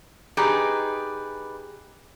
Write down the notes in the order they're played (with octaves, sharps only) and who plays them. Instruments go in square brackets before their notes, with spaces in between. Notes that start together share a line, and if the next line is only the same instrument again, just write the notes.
[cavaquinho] D#4 B4 D5 [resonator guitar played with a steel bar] G4 G#4